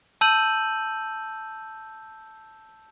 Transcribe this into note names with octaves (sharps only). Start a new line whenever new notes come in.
A5 E6 G6 D#7 F#7